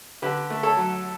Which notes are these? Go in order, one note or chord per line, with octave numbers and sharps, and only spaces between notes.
D3 G4 B4
A3
A4 C#5
F#3